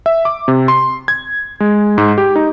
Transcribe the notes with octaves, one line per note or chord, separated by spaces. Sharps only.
E5
D6
C3
C6
G#6
G#3
G#2
G4
D#4